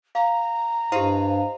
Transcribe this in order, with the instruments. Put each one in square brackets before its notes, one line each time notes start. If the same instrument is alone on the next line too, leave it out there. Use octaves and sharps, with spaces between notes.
[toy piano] F5 [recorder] A#5
[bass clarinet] G2 [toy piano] E4 G4 [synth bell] C5 D#5 F5